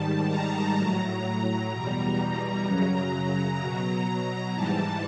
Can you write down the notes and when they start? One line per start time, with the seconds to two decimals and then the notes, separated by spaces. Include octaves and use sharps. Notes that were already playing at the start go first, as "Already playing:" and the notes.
Already playing: G#2 D#3 G3 A5
0.28 A#5
0.76 A2 F#3
1.71 E2 B2 G3
2.66 F#2 C#3 F#3 A#5
3.60 B2 F#3
4.54 G#2 E3 G3 A5